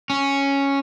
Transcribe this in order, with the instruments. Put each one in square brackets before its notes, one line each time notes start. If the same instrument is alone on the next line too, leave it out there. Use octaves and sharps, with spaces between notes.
[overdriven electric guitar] C#4